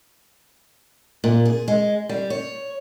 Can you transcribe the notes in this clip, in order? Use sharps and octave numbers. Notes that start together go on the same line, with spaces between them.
A#2
G#4
G#3
G3
C#5